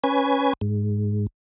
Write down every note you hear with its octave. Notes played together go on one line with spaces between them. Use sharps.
C#4 B4 G#5
G#2